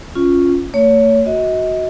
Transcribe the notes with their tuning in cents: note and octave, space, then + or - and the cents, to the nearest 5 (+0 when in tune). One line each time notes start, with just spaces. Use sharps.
C#4 +0 F4 +0
A3 +45 C#5 +25
F#4 +0 D#5 +35